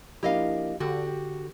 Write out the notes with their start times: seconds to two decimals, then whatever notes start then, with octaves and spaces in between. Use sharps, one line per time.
0.23 F3 A#3 D4 E4 G4 D#5 F5
0.80 D3 F#4 G4 A4
1.07 G4